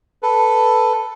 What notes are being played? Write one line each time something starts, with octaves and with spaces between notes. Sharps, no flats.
A4 B4